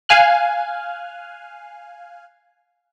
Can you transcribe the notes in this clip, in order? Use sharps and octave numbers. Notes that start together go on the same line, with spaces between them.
F5 G#5 F6 F#6